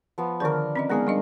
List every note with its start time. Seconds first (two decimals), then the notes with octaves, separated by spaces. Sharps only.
0.18 F3 B3
0.40 D3 D#3 D4 G#4 A#4
0.76 C4 C#4 D#5
0.89 G#3 A#3 B3 D#4 G#4 A#4
1.07 G3 D4 D#5